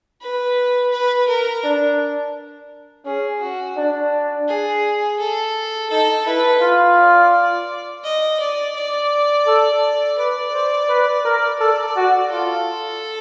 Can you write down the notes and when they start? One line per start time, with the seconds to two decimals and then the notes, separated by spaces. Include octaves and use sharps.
0.21 B4
0.92 B4
1.28 A#4
1.64 D4
3.05 C#4 G#4
3.41 F#4
3.77 D4
4.49 G#4
5.19 A4
5.91 D#4 A4
6.26 E4 B4
6.61 F4
6.97 D5
8.04 D#5
8.40 D5
8.76 D5
9.47 A4
10.18 B4 D5
10.53 C5
10.89 B4
11.25 A#4
11.60 A4 D5
11.96 F#4
12.31 F4 A4